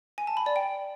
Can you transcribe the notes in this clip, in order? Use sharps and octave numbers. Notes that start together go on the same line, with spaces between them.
G#5
A5
B5
D5
G5